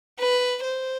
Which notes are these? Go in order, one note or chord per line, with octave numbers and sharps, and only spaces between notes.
B4
C5